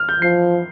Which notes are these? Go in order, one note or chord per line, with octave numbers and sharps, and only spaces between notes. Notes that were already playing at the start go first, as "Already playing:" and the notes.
Already playing: F6
G6
F3 C7